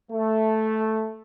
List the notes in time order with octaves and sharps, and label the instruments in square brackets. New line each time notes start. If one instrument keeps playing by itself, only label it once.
[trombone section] A3